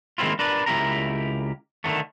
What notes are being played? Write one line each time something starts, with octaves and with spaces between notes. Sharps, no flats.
D#3 G#3 A#3 C4 E4 F4
D4 A#4 B4 D5
C#2 E4 G4 A#4 A#5
D3 D#3 F#3 A3